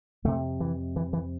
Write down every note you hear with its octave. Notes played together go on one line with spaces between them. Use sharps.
F2 C3 A3
E3
E3
E3